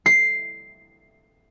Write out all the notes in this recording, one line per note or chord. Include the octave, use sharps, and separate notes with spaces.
C7